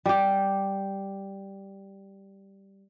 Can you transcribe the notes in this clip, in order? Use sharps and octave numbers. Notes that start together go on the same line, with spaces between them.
G3 G4